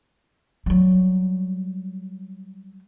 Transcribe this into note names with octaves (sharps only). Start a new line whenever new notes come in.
F#3 G3